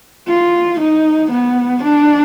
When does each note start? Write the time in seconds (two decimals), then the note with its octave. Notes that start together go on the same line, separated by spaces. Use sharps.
0.28 F4
0.80 D#4
1.31 B3
1.83 D4